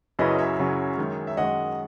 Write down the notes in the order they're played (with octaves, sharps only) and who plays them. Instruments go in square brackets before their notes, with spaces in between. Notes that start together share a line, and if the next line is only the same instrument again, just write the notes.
[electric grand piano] F#2 C#3 F#3 C#4 E4 [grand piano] B4 D#5
[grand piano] C#5 E5
[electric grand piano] F#2 C#3 F#3 C#4 E4
F#2 D#3 G#3
[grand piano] E5
[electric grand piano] F#2 D#3 G#3 [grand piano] D#5 F#5